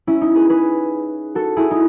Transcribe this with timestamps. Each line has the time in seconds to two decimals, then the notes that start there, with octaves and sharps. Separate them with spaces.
0.07 C#4 E4
0.21 D#4
0.35 G#4 B4
0.49 G#4 B4
1.35 F#4 A4
1.56 E4 G#4
1.71 D#4